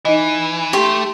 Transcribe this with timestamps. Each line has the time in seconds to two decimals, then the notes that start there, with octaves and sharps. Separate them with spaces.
0.05 E3 D#4 D#5
0.73 A3 G4 C6